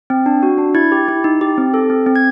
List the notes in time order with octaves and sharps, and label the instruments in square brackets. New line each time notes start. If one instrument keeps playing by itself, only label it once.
[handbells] C4
D4
F#4
D4
E4 G#6
G4
E4
D#4
G4
C4
A4
C4
C4
G#6